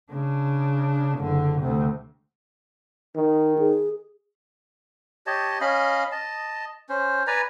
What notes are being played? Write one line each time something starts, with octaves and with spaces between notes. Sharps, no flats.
C#3 D4
F#1 D3
D2 C3
D#3 D#4
G#4
G4 C#5 D#5 A5
C#4 D#5 F5 B5
D#5 A5
C#4 C5
B4 D5 G#5 A#5